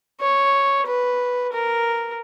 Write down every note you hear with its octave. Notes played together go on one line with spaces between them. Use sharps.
C#5
B4
A#4